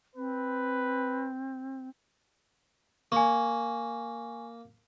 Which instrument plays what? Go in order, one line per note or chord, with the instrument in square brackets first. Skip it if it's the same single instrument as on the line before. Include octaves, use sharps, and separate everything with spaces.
[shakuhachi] C4 [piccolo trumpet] B4
[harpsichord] A#3 [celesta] G#5 C#6